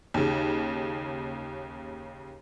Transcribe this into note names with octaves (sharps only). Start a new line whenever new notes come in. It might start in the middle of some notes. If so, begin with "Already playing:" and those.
D#2 C#3